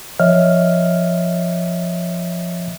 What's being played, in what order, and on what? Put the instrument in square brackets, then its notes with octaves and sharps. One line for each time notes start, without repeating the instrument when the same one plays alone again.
[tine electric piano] F3 C#5 D#5 E5 F6